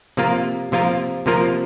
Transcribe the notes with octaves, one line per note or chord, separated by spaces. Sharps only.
C3 F3 A#3 F4 A#4
C3 F3 A#3 F4 A#4
C3 F3 A#3 F4 A#4